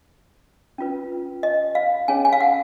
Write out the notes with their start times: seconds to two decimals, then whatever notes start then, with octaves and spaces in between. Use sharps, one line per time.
0.78 C#4 F4 B4
1.43 D#5
1.75 F5
2.08 C#4 G#4 C#5 G#5
2.25 G#5
2.33 F5
2.41 F#5